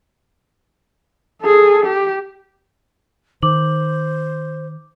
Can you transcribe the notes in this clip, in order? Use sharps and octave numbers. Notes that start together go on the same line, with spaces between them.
G#4 A4
G4
D#3 C5 D6 F#7